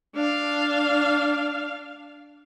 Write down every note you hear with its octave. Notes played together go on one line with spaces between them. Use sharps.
D4 F5